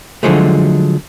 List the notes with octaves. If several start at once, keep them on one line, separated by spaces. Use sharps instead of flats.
D3 F3 F#3 G#3 A3